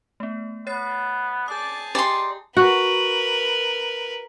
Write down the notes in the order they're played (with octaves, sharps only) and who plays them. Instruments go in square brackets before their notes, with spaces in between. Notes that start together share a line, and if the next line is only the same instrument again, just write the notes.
[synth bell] A3 B3
[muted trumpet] B3 [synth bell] C#5 A6 C7
[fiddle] G#4 A5 [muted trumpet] D5 [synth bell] D#6 G6
[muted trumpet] D#4 [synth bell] G4 G5 G#5 [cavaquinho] D5 C6
[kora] F#4 [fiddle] A#4 B4